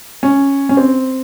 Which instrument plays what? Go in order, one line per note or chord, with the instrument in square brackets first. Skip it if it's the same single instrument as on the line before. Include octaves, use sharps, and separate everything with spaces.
[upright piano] C#4
C#4
C4